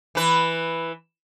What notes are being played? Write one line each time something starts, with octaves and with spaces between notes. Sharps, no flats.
E3 B4